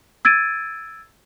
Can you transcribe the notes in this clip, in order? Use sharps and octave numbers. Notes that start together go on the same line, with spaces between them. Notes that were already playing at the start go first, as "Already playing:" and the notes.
E6 G#6 A6 D7 D#7